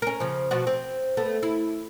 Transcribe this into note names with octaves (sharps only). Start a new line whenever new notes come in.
C#4 A#4
C#3 F3
B2 F3 F#4
C4
A3 B3
E4